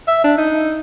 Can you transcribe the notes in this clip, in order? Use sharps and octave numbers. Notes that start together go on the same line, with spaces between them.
E5
D4
D#4